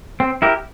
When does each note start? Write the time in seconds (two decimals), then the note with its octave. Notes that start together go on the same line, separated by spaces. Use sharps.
0.20 C4
0.42 E4 G4 A#4